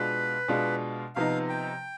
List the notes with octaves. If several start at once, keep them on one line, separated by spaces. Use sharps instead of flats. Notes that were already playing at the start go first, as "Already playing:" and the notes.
Already playing: B2 G#3 D4 F4 B4
B2 G#3 D4 F4
C3 F3 B3 D#4 F5
G5